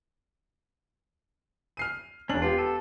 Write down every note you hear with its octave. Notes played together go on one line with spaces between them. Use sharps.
F6 C7 D#7
E1 C#4 D4 F#7
B3 F4 G4
A4